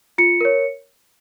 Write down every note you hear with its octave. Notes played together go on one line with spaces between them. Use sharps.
F4 C#7
A#4 C#5